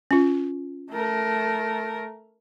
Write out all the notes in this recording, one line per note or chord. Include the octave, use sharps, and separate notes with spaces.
C#4 F4
A3 A#4